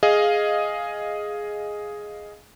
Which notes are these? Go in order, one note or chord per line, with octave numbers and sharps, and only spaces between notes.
G#4 D#5 F5